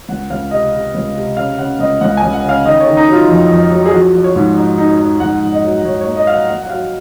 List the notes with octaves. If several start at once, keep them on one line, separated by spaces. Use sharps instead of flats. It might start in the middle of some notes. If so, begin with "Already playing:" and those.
C#2 F#5
C#2 F5
C3 D#5
C3
C#2
C3
C#3 F5
C#3 F#5
C#2 D#5
C#2 F#5
F#5
G#5
C#2
F#5
C#3 F5
D#3 D#5
C#5
D#3
D#4
F#3
F4
F2
F2
F#3
G#4
F3 F#4
F3
C#5
G#2
D#4
D#4
D#4
G#2 F#5
G#2
D#5
F#3
G#2 C#5
A#3 C#5
D#5
F#3 F5
F#5
A#3 F#5
F#5
F#3 F5